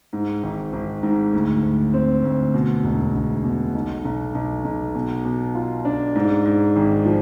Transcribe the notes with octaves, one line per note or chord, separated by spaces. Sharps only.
G#2
G#1
G#1
G#2
D2
D2
C4
D2
B2
E1
E1
B2
B1
B1
B1
B1
B2
B2
F4
D4
G#2
G#2
G#1
F3